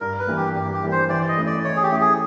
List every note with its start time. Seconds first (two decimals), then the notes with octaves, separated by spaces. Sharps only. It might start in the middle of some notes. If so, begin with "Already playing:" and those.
0.01 G2 A#4
0.19 B4
0.27 E3 G3 A#3 D4
0.37 G4
0.55 G2 G4
0.73 G4
0.83 E3 G3 A#3 D4
0.92 C5
1.09 E3 D5
1.28 D#5
1.37 A3 C#4 E4
1.46 D5
1.64 E3 C#5
1.76 G#4
1.83 G4
1.91 A3 C#4 E4
2.01 G#4